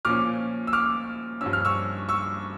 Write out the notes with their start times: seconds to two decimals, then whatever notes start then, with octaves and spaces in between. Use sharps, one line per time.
0.05 A#2 F3 C#4 D6 F6
0.67 E6
0.73 D6 F6
1.41 G2 F3 C#4 E6
1.53 F6
1.65 C#6 E6
2.09 C#6 E6